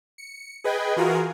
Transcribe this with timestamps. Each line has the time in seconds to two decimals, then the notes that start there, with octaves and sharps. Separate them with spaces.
0.18 C#7
0.64 G#4 B4 D#5 G5 G#5
0.97 E3 F4 F#4 G#4 A#4